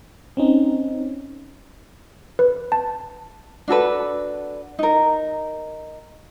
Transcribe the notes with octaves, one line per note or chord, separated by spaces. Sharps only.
C4 C#4 D#4
B4
A5
D4 F#4 A4 B4
D#4 A#4